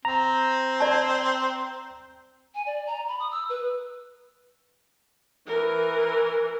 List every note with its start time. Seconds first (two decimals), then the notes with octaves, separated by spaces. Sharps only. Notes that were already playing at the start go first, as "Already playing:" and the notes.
0.05 C4 A#5
0.80 D5 A5
2.55 G#5
2.66 D5
2.87 A#5
3.08 B5
3.20 D#6
3.31 E6
3.49 B4
5.47 E3 A#4